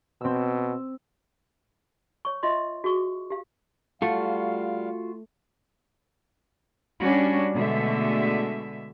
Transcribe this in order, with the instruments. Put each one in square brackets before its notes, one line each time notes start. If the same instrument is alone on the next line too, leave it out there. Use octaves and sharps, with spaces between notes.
[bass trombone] B2 [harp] C4 E6
[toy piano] C#5 C#6
F4 D#5 E5 C6
F#4 G#4 C#6 D6
G4 F5
[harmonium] G3 F5 [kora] A3 [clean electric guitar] F4 F#4
[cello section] G3 C#4 D4 F#4
B2 D3 G#3 A3 E5